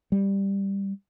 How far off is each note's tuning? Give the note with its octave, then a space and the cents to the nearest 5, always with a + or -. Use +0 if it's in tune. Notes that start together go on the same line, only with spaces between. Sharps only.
G3 +5